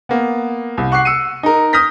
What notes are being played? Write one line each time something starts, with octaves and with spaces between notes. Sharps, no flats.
A#3 B3
C2
F#5 C#6 D6 F#6 C7
E6 C#7 D#7
D#4 A#4
D#6 F6 G6 A#6 B6